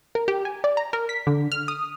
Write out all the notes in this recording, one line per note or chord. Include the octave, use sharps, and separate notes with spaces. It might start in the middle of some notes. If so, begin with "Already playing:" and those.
A#4
G4
G#5
D5
A#5
A#4
B6
D3
F6
D#6